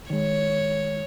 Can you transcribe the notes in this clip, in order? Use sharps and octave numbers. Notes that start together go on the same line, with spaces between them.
D#3 G#3 C#5